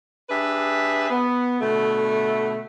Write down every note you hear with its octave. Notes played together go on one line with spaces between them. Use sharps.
D4 G4 G#4 B4 E5
B3
B2 D3 A3